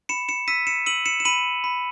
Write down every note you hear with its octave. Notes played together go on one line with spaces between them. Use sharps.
B5 C#7 E7
C#7 E7
E6 B6 D#7
C#7 E7
E6 D#7 F#7
C#7 E7
E7
B5 D#7 F#7
B5